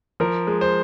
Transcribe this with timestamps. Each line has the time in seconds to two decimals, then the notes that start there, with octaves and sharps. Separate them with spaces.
0.20 F3 A#4
0.47 G#3
0.61 C5